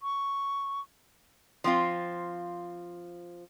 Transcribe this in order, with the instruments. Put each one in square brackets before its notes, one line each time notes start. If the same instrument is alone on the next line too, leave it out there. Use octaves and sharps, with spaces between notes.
[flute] C#6
[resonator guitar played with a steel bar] F3 C4 F4